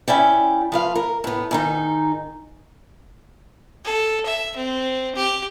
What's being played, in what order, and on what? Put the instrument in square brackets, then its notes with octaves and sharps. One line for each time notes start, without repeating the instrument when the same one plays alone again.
[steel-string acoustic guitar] C#4 E4 D5 G5
F3 B4 F5
A#4
A2 B3
G#2 D#3 D#4
[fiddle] A4
E5
C4
G4